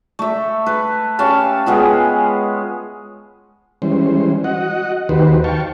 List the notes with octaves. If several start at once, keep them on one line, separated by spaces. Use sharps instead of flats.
A3 E5
B4
C#4 G4 F5 A5
G#3 B3 F4
E3 G3 G#3 C#4 C5
F#4 D#5 F#5
D#2 D#3 F#4 G4 B4 C5
F5 G5 A5 C#6